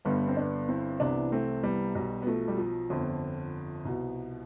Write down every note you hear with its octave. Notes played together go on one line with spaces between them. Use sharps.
G1 G2 D3 G3 B3
C4
B3 D4
C4 E4
C2 C3 E3 B3 D4
A3 C4
G3 B3
B1 B2 G3
B3
F3 A3
G3
F3
G1 F2 D3
C2 B2